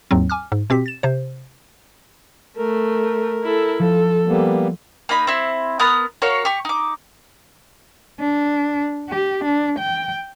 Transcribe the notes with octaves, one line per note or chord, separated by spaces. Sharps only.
D#2 G#2 F#3 C4
G#5 D6 F6
G#2
B2 C4 G4 B6
A6 E7
C3 C5
A3 A#4
B6
E4 A4
F3 A4
G3 A#3 B3
A#3 D#4 B5
C4 E4
B3 A#4 D#6 F#6
F#4 A#4 C#5 F5
G4 C#6
D#4 D6
D4
G4
D4
G5